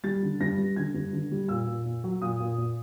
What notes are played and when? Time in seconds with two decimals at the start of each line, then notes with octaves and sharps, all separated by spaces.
0.04 G3 A6
0.22 D3
0.40 G2 A#6
0.58 G3
0.76 D3 G#6
0.94 G2
1.13 D3
1.31 G3
1.48 A#2 E6
1.67 A#2
1.85 A#2
2.04 F#3
2.22 A#2 D#6
2.40 A#2
2.58 A#2